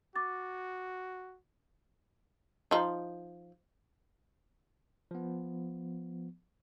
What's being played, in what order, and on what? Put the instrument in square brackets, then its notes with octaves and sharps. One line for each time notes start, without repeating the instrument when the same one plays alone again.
[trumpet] F#4 [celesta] D6 A6
[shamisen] F3 D#4
[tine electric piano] F3 B3